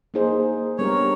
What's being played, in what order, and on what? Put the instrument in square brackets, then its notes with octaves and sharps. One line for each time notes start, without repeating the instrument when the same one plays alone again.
[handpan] A#3 D#4 G#4 C5
[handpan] G3 B3 D4 G4 A#4 [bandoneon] C#5